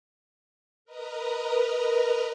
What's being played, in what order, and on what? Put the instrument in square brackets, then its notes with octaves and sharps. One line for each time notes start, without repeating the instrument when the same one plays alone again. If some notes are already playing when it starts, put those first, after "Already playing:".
[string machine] A#4 B4 D#5 A#5